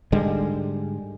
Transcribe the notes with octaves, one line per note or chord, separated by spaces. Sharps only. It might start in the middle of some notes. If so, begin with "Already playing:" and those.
G#2 D3 G3 G#3